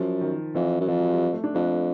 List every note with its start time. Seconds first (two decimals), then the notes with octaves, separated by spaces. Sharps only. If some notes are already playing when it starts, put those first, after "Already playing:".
Already playing: F#2 F3
0.21 D#3
0.54 F2 E3
0.80 F#2
0.88 F2 F3
0.99 F#3
1.11 G3
1.33 A3
1.44 D4
1.55 F2 D4